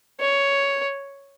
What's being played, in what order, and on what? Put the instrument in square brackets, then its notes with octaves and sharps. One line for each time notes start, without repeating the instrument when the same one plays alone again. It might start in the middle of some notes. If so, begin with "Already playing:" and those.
[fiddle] C#5